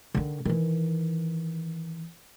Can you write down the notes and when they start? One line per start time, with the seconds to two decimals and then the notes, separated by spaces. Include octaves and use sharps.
0.14 D3 D#3
0.45 D#3 E3